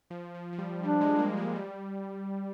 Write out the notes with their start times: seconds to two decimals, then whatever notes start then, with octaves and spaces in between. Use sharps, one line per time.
0.10 F3
0.35 F3
0.53 F3
0.58 G3
0.83 G3 D4
1.01 G#3
1.18 A#3
1.37 G#3
1.56 G3